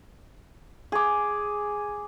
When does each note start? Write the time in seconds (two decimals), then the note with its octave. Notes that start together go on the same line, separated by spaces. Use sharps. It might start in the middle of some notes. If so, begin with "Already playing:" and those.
0.92 G#4 D6